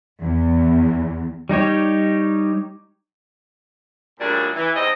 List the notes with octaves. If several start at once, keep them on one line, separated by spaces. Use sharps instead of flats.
E2
G3 D#4 G4 C#5
F#2 A#2 C#3 G3 A3 D4
E3
E2 G3 C4 D#4 D#5